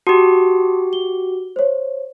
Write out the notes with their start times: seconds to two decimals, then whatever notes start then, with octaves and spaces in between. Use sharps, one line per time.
0.07 F#4 G4 A5 C6 D#6
0.93 G7
1.56 C5 C#5